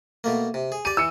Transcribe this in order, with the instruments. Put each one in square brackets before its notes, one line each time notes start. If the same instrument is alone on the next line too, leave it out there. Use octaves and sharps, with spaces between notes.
[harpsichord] B2 A3 A#3
C3
G#4
[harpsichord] G4 D5 [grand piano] D#7
[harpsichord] E3 [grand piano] E6 C#7